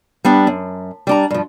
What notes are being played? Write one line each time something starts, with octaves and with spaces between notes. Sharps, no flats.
G3 B3 D4
F#2
G3 D4 A#5
G2 F3